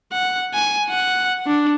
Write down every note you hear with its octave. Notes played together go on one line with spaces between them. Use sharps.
F#5
G#5
F#5
D4